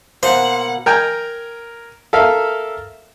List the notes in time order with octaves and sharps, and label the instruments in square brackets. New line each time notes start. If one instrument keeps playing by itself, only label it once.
[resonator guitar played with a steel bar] B2 A#3 [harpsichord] C5 [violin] F#5
[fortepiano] A#4 G5 G#5 A#5
A4 A#4 E5 F5